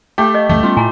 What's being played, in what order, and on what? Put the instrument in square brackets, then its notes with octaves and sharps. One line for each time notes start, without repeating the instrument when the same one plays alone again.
[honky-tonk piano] A3 [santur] G4 [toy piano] F5 G5
[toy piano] D#5 F5
[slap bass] C#2 F#2 E3 [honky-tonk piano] A3
[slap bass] G3 B3 C#4 [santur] F4
[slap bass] A2 [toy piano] E4 G#5 A#5